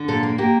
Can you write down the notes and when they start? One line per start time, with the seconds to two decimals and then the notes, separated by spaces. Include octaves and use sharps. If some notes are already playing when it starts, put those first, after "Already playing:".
Already playing: D3
0.08 A#2 A4
0.23 A#3
0.38 A#3 G4